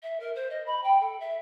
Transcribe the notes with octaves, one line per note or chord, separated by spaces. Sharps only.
E5
A#4
C5
D#5
B5
G5
A4
E5